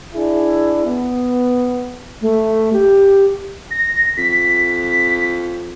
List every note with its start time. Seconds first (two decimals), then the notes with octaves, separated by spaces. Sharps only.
0.15 D4 E4 G#4
0.85 B3
2.21 A3
2.73 G4
3.71 A#6
4.17 F2 B6